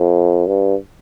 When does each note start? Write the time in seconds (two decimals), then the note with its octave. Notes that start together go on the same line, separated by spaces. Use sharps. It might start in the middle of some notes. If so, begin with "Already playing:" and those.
Already playing: F2
0.47 G2